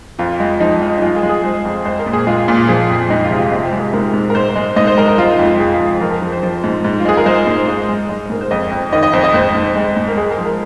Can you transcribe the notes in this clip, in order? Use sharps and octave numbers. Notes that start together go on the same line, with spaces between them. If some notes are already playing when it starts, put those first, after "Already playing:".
F2 F4
G#3
F3 D#4
G#3
D#4
G#3 F4
G#4
G#3
G#4
G#3 C5
F2
G#3 C5
A#4
A#2
G#4
G#3 F4
A#2
F4
F3 G#4
F2
G#3 D#4
F4
C3
F4
G#2 D#4
F4
G#3
G#4
G#2 A#4
G#2
A#4
G#2 C5
G#3
G#2 D#5
C5
G#3 A#4
A#4
G#3 F4
D#4
F2
F4
G#3 G#4
F4
F2
G#4
F3 A#4
A#4
F3
C5
F3
G#2
G#2
F4
G#3 G#4
A#4
G#3 C5
G#2
G#2 D#5
G#3
G#3 D#5
G#2 A#4
C5
F2 D#5
F2
D#3 D#5
D#5
F2 C5
D#5
G#2 C5
G#2
G#3
G#2
A#4
G#3 G#4
A#4
F3
A#4